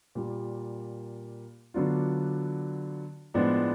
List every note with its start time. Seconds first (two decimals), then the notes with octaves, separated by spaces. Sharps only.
0.15 A#2 G3 A#3
1.74 D3 F#3 B3 D4 F4
3.34 A2 F3 G#3 B3 D4